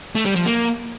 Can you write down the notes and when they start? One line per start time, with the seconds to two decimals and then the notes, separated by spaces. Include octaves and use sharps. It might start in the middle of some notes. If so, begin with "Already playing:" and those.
0.15 A3
0.26 G3
0.36 F3
0.46 A#3